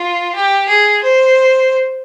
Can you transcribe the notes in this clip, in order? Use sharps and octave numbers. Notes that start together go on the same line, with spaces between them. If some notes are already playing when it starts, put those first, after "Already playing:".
Already playing: F4
G4
G#4
C5